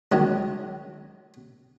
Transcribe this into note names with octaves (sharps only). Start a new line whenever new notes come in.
C#2 D#3 F#3